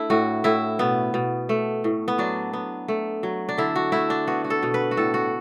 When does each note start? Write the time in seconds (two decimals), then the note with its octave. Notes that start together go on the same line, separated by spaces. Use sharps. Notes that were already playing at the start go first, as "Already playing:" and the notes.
Already playing: A3 D4 E4
0.10 A2 F#4
0.44 A2 E4
0.79 B2 B3
1.14 B2
1.49 A3
1.84 A2
2.08 B3
2.18 F#3 D4
2.53 B3
2.88 A3
3.23 F#3
3.49 D4
3.58 D3 E4
3.76 F#4
3.92 A3 E4
4.10 D4
4.27 B3 F#4
4.44 F#4
4.50 A4
4.63 B2
4.74 B4
4.91 F#4
4.97 A2 A4
5.14 F#4